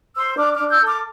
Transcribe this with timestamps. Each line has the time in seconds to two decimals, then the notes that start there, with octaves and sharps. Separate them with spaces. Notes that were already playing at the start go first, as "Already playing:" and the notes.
0.15 C5 C6 E6
0.37 D4 D6 F6
0.53 D6 F6
0.58 D4
0.69 E6 G6
0.80 A4
0.86 D6 F6